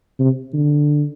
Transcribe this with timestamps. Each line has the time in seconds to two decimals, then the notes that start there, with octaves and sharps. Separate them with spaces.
0.19 C3
0.54 D3